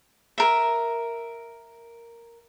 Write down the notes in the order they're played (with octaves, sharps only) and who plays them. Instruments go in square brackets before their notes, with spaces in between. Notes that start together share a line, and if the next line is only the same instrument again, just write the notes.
[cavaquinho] A#4 E5